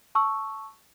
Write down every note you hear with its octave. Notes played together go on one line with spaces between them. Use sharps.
A5 C#6 E6